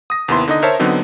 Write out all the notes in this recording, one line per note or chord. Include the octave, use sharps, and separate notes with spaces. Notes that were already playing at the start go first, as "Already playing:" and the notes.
D#6 A#6
D#2 C3 B3 E4 C6
D3 D#4 D#5
A#4 C5 C#5 E5 A5
D3 F#3 B3 C4 D#4